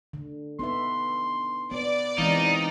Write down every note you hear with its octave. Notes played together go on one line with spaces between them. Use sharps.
D3
B3 D#4 E5 C6
B3 D5
E3 G#3 C4 D#4 F5